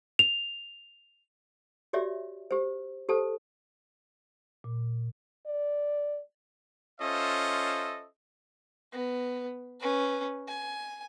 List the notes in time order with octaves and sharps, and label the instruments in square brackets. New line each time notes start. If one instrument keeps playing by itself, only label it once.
[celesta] F7
[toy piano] F#4 G4 C#5 D5 E5
G4 C5
G4 A4 C5 A5
[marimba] A#2
[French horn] D5
[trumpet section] C#4 F4 A4 C5 D#5 E5
[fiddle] B3
C#4 B4
G#5